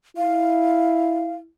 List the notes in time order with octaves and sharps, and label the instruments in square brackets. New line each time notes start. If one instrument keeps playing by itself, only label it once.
[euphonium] E4 [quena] F5